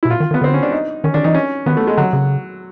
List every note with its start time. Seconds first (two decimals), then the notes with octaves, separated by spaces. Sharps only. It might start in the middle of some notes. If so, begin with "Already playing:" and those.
0.03 E4
0.05 B2
0.10 A#2 F4
0.20 D#3
0.31 D#3
0.34 B3
0.41 D3 C4
0.54 C#4
0.63 D4
0.72 D#4
1.04 D#3 C#4
1.14 D#3 D4
1.24 E3 D#4
1.35 C#4
1.66 D#3 B3
1.77 A3
1.87 G#3
1.97 D3 F#3
2.13 C#3